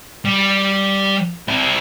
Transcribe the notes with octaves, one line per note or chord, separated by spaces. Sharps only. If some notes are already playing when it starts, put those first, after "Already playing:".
G3
C4 E4